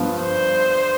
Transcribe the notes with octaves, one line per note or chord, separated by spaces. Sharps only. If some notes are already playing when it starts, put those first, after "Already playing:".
Already playing: G2 F3 B3 F4
C5